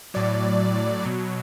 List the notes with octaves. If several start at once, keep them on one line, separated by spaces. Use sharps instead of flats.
A2 F#3 D5
B2 F#3